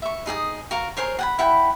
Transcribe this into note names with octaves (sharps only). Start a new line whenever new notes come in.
E5 C#6
D#4 G#4 G5 D#6
F#4 A#4 F5
G#4 A#4 C5 C#5
F#5 G5 B5
E4 F#5 G5 B5